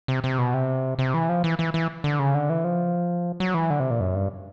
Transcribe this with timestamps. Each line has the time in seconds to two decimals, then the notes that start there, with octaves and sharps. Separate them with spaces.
0.08 C3
0.24 C3
0.38 B2
0.54 C3
0.99 C3
1.14 E3
1.29 F3
1.44 E3
1.59 E3
1.74 E3
2.04 D3
2.19 C#3
2.34 D3
2.50 E3
2.64 F3
3.40 F#3
3.54 E3
3.70 D3
3.80 C3
3.90 A#2
4.00 F#2
4.15 G2